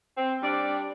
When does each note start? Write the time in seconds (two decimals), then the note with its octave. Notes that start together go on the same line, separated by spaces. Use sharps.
0.17 C4
0.41 G3 D4 D5